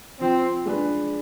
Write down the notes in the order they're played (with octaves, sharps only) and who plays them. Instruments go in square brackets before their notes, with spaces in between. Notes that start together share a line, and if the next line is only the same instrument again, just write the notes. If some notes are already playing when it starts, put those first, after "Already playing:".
[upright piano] F3 [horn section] C4
[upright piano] G#3 D4 G#4 B4